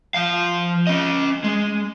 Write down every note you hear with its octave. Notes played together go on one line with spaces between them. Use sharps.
F3 F5
C#4 D#5
G#3